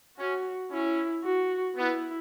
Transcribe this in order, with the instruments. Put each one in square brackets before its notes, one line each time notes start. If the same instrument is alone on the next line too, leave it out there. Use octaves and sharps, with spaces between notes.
[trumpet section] C#4 [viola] F#4
[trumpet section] C#4 [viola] E4
[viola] F#4
[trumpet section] B3 [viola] E4